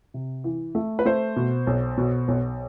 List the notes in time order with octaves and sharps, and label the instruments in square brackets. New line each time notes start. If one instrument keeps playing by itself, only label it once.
[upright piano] C3
E3
A3
B4
A3 C5
B2
B1
B2
B1